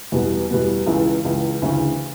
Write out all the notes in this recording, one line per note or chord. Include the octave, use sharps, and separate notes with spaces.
E2 B2 G3 B3
E2 B2 G3 B3
C#2 C#3 E3
C#2 C#3 E3
D2 C#3 E3